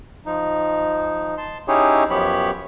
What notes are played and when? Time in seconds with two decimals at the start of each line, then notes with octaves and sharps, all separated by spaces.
0.26 F3 D#4
1.38 A5 C6
1.68 C#4 D#4 E4 G4 G#4 C#5
2.10 F#2 F3 B3 G4 C#5 B5